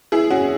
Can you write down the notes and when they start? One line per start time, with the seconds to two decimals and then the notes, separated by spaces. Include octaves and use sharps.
0.12 E4 G#4
0.30 C#4 F#4